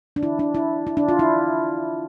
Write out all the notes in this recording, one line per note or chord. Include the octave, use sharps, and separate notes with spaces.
D4
E4
D4
E4
E4
D4
F4
E4